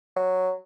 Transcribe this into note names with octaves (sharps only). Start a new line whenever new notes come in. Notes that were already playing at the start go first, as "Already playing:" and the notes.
F#3